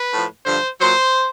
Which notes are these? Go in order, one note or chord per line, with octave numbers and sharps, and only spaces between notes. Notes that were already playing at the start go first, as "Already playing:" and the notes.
Already playing: B4
A2 F3
G2 D3 F3 C5
A#2 F#3 C5